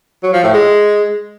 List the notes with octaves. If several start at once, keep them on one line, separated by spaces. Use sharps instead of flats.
F#3
F3
A2
G#3